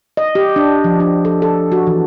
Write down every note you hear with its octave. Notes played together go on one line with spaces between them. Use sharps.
D#5
G4
D4
F3
D4
A4
A4
F#4
E3